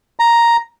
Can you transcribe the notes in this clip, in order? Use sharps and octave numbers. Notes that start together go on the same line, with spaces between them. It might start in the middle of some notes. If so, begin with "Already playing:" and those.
A#5